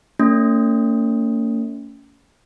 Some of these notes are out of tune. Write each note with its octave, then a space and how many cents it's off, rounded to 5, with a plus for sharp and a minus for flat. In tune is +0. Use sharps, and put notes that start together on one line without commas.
A#3 -45 C#4 +25